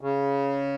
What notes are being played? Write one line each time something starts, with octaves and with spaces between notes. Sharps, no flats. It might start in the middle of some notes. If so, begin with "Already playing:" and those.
C#3